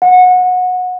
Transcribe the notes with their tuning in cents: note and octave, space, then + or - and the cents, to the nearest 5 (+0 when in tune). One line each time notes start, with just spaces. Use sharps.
F#5 -20